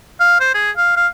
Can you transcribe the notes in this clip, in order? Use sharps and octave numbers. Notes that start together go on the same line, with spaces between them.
F5
C5
G#4
F5
F5